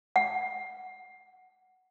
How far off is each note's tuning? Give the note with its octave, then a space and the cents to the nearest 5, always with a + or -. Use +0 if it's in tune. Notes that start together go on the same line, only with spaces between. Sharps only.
F#5 +5